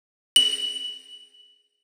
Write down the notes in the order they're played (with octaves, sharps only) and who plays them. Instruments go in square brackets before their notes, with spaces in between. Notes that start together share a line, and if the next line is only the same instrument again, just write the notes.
[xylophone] F#7